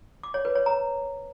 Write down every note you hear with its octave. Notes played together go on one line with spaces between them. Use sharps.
D6
C#5
B4
C#5
A#5